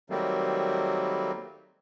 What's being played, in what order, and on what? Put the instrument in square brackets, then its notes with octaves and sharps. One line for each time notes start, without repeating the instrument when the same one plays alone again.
[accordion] D#3 F#3 G3 A3 A#3 C4